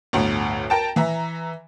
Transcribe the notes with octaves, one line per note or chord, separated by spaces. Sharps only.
G1 D2 A2
A#4 G5 A5
E3 E5 A#5